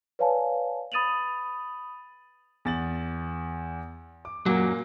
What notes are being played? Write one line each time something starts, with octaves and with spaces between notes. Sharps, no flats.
B4 C#5 D5 F5 G#5 A5
B5 D#6 A6 D#7 F7 F#7
E2 A6 F#7
D6
F#2 A#2 F#3 A#3